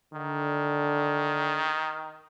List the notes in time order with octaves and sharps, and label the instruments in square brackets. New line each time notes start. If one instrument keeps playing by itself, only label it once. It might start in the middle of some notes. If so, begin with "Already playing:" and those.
[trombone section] D3 [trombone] D#3